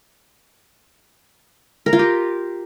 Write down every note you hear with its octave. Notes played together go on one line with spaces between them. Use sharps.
A#4
F4
G4